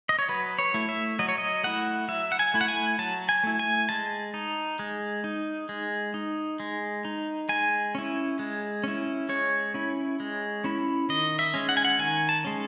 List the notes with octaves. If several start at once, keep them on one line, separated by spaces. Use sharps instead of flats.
D#5
C#5
F#3 B4
C#5
A3 E4
E5
F#3 D#5
C#5
D#5
A3 E4 F#5
F#3 E5
F#5
G#5
A3 E4
F#5
G#5
F#3 A5
G#5
A3 E4
G#5
G#3 A5
D#4
G#3
D#4
G#3
D#4
G#3
D#4
G#3 G#5
C#4 E4
G#3
C#4 E4
G#3 C#5
C#4 E4
G#3
C#4 E4
D#3 D#5
E5
G#3 C#4
F#5
G#5
F#5
D#3 G#5
A5
G#3 C#4